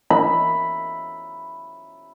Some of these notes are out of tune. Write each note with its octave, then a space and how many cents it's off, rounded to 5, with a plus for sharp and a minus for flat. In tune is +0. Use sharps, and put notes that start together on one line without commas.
E5 +0 B5 +0